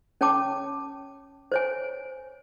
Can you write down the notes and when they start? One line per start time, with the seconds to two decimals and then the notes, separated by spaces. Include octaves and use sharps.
0.21 C#4 C#5 G5 A5 D6
1.52 C5 C#5 G#5